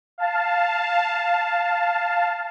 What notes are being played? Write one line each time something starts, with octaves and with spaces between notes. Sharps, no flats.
F5 A5